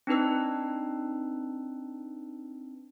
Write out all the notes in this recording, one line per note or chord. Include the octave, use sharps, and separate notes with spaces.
C4 D4 D#4 B4 E6